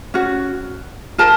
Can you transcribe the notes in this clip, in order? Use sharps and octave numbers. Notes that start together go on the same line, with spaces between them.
C#4 F#4
F4 A#4 A5